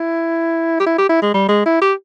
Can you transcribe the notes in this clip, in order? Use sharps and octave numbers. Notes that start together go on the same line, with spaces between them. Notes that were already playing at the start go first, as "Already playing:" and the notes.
Already playing: E4
G4
E4
G4
E4
G#3
G3
G#3
E4
G4